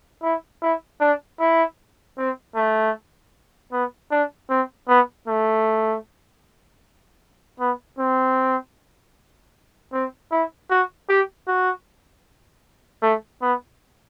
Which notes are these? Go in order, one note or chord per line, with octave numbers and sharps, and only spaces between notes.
E4
E4
D4
E4
C4
A3
B3
D4
C4
B3
A3
B3
C4
C4
E4
F#4
G4
F#4
A3
B3